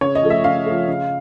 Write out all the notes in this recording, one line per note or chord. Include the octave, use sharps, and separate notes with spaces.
C#3 C#5
D#5
F3 A3
E5
C#3 F5
F3 A3
C#3